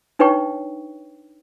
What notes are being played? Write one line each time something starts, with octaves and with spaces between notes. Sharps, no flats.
D4 D#4 B4 C#5 G5 C#6